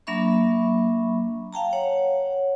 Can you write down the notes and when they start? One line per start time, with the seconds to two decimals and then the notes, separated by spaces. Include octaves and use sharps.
0.07 F#3 A#3 D4 E5 B5 C#6
1.53 F5 G5 A5 A#5
1.73 C#5 F#5